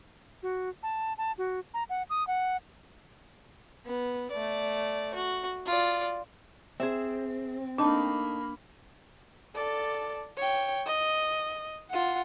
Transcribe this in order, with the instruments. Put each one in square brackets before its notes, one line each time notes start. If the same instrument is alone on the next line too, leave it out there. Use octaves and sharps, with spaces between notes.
[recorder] F#4
A5
A5
F#4
A#5
F#5
D#6
F#5
[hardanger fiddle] B3
A3 D5
F#4
F4 D5
[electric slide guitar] C4 [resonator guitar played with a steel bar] G#4 C5 E5
[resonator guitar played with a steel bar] A3 D#4 [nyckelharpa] A#3 B5 [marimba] D4 A5
[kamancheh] A4 D5
C#5 G5
D#5
F4 F#5